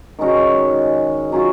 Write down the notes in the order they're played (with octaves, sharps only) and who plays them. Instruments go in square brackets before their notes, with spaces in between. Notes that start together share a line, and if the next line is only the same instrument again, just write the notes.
[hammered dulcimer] D#3 G#3 C#4 F#4
F#3 C#4 F4